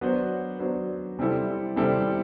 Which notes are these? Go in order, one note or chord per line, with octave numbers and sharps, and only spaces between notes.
F#3 B3 D4 F#4 C5
F#3 B3 D4 F#4 C5
C3 G3 C4 E4 A4
C3 G3 C4 E4 A4